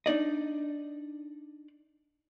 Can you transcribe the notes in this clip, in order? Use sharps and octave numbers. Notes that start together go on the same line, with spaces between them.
D4 D#4 D5 D#5